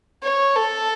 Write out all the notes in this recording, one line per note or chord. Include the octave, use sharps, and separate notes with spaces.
C#5
A4